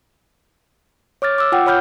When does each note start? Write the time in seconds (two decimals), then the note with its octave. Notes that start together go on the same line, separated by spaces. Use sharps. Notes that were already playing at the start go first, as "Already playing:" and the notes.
1.22 C#5 D6 F6 A6
1.38 D6 E6
1.52 F4 F#5 G5
1.67 C#5 B5 F6 G6